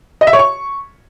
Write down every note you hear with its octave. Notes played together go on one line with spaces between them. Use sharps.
D#5
E5
C#5
C#6